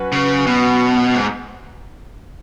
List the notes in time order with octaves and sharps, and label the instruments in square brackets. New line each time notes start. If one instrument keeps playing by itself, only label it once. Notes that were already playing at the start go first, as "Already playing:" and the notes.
Already playing: [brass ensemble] F#3 C#4 F#4 B4
[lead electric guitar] C#3
B2
G#2